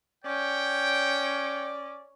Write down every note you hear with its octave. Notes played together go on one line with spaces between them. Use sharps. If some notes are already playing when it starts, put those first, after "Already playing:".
C#4 C#5 D5 G5